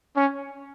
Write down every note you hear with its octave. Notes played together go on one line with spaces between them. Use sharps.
C#4